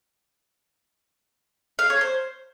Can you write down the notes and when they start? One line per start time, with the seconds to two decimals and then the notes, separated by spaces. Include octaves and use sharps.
1.79 F5
1.90 C#5
2.01 C5